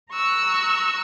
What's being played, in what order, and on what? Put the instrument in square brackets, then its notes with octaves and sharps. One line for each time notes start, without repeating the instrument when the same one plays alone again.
[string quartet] A#5 C#6 E6 F#6